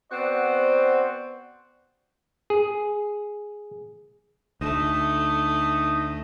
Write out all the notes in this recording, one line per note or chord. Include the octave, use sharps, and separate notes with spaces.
B3 C4 F#4 C5 D5
G#4
D2 A3 D#4